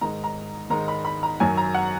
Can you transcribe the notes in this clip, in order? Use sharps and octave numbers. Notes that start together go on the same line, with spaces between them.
G#2 D#3 G#3 D#4 A#5
A#5
G#2 D#3 G#3 D#4 A#5
B5
B5
A#5
F#2 D#3 F#3 G#5
A#5
F#5